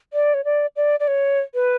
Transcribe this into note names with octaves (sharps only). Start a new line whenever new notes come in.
D5
C#5
D5
D5
D5
C#5
B4